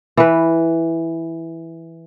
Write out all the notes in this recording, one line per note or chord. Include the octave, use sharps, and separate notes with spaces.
E3 B4